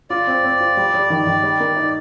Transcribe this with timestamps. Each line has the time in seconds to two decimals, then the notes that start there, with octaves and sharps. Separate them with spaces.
0.10 F4 D5
0.27 C4
0.44 C4
0.60 F4
0.77 G3
0.94 G3
1.10 D#3
1.27 D#3
1.43 G3
1.60 A#3
1.76 D#4